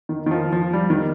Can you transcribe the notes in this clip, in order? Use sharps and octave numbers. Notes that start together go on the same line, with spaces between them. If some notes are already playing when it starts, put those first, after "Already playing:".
D#3
D#3
F3
F3
G3
D#3